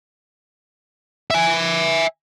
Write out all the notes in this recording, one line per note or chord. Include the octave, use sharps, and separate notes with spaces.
E5 G#5